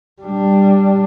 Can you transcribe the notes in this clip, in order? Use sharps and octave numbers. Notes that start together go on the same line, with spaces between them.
G3 D4